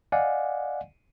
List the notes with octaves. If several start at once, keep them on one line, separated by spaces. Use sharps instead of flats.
D5 D#5 F5 F#5 G#5